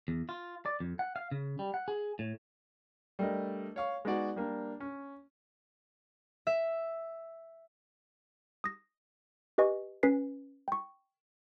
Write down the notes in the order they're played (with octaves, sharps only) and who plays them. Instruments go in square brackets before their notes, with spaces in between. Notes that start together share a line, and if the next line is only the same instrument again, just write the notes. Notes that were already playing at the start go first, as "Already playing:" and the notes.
[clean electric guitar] E2
F4
D5
F2
F#5
F5
C#3
G3
F#5
G#4
A2
[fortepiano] G3 A3 D4 A#4 D#5
C#5 F5 C#6
G#3 B3 D#4 F#4 D5 F#5
G3 A#3 D4
C#4
[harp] E5
[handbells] D#6 A#6
G4 B4 D#5 G#5 C#6
C#4 B4 G#5 B6 C7
G5 C#6